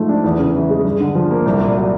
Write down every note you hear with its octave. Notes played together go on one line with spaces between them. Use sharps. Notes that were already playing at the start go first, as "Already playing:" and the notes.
Already playing: G#2 F3 A3
D4
E2
C#3
E3
G#3
G2
D3
F3
A#3
C2
A#2
F#3